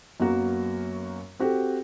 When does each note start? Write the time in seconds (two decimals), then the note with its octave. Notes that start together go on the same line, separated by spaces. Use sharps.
0.20 F#2 F#3 A#3 B3 F#4
1.40 C4 F#4 G4 A4